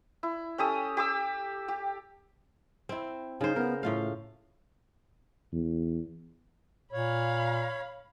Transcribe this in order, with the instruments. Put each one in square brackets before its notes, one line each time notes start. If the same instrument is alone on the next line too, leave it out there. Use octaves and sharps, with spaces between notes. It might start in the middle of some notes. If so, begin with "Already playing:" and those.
[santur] E4
C#4 G4 A4 D#6
G4 D6 E6
G4
[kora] C4 E4
[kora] C#3 C5 [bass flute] D#4
[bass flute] B3 [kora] A#4
[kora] A2 F4 F5 [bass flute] A3
[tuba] E2
[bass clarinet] A#2 [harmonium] C#5 [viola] F5 B5